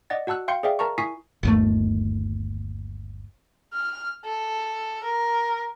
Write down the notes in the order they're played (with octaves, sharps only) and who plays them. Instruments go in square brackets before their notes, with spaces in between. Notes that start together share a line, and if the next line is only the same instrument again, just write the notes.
[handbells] D5 D#5 F#5 A6
F#4 F#5 A5 E6 F#6
F5 G5 C6 G6 C#7
G#4 C5 D5 E5 F5 G5
A#4 A5 A#5 C#6
E4 G#5 C#6 D#6 B6 C7
[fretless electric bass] G1 D#2 A3
[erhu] F6
A4
A#4